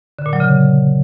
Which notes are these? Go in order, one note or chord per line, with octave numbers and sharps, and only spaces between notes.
D3
A#2
F#3
C#3